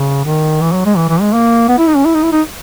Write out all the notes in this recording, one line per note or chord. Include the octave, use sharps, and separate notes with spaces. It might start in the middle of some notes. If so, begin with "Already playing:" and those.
Already playing: C#3
D#3
E3
F#3
G#3
E3
E3
G#3
A#3
B3
E4
D#4
C#4
E4
D#4
E4
D#4